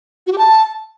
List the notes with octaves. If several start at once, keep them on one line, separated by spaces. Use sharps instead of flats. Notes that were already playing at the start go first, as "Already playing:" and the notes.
F#4
G4
A5